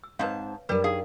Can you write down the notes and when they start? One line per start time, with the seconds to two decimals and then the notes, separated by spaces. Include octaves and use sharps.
0.04 E6
0.19 G#2 C4 B4 C#5 F5 A5
0.69 F#2 G3 D4 G4 A#4 B4
0.84 D#4 G#4 F5